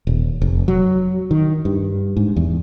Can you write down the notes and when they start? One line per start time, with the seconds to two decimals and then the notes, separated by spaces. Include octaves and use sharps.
0.07 D#1
0.42 F1
0.68 F#3
1.31 D#3
1.65 G2
2.17 G#2
2.36 E2